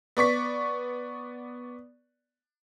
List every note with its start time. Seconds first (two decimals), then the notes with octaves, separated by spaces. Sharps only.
0.17 B3 D5 C#6 B6